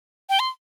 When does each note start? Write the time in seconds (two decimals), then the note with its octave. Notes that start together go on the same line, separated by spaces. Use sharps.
0.30 G5
0.39 C6